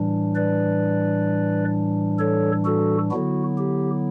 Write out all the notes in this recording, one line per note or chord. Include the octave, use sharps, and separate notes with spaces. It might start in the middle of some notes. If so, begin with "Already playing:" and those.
Already playing: A2 E3 G3 D4
B4 D5
A4 C#5
F#4 A4
D3 F#3 B3 E4 F#4
G4